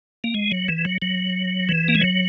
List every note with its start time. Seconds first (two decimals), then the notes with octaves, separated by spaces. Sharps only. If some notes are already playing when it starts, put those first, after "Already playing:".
0.24 A#3
0.34 G#3
0.52 F#3
0.68 E3
0.85 F#3
1.02 F#3
1.69 E3
1.88 A#3
1.95 G#3
2.01 F#3